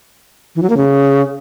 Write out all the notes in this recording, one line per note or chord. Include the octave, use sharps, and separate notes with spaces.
E3
F#3
A#3
C#3